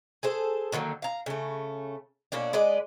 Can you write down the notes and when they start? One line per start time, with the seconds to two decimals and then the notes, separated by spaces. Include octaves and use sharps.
0.23 G#4 A4 C5
0.72 D3 D#3 F#3 A#3
1.02 F5 A#5
1.26 C#3 A3
2.32 B2 A#3 C#4 D4
2.53 G#3 B4 D5 D#5